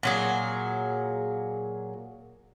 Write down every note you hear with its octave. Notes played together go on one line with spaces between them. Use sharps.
A#2 F#3 G#4